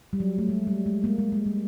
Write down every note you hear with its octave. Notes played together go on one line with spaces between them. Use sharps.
G3
F#3
A3
G#3
G3
G#3
G#3 A#3
G#3
G#3
G3